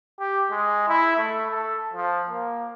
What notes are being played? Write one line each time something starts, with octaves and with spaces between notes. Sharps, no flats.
G4
G#3
E4
A3
A4
F3
A#3